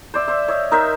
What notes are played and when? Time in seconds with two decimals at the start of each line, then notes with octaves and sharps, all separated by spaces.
0.14 C5 D5 E5
0.28 C5 E5
0.48 C#5 D#5 E5
0.71 D#4 A#4 C5 E5